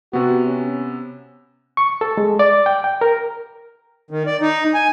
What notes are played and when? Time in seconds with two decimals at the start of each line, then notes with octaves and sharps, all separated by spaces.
0.13 C3 B3 F#4
0.46 C#4
1.77 C#6
2.01 A4
2.17 G#3
2.39 D5
2.66 G5
2.84 G5
3.01 A#4
4.11 D#3
4.26 D5
4.41 D#4
4.74 G#5